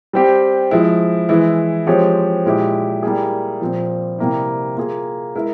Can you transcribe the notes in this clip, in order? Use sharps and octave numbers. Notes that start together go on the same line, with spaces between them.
G3 C4 G4
F3 G#3 E4
E3 G#3 E4
F3 G#3 C4 G4 C#5
A#2 G#3 E4 G4
G3 A#3 E4 G#4
A#2 F3 C4 F4
C3 G3 A#3 E4
A#3 F4 G#4
G#3 E4 A#4 E5